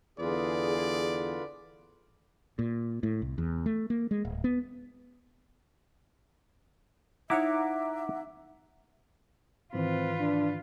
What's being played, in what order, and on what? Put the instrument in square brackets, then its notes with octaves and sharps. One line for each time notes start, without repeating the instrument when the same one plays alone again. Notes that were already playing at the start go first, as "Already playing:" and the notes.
[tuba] E2 [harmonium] D3 F4 B4 [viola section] G#4 [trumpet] D5
[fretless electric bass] A#2
A2
C2
E2
A3
A#3
G#3
D1
B3
[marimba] D#4 [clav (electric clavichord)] E4 C#5 [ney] E5 [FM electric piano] F#5 A#5 D6
[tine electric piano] G#2 D#3 E3 [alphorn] C4 [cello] F4 B4
[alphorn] D4